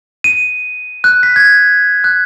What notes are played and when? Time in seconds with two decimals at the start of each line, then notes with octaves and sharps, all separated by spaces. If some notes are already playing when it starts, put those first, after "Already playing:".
0.24 D#7
1.04 F#6
1.23 B6
1.36 G#6
2.04 F#6